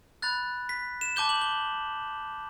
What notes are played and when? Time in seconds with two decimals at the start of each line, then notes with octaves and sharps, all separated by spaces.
0.22 B5 F#6 A6
0.69 B6
1.01 E7
1.16 A5 D6 G6 G7
1.29 F#7
1.42 G7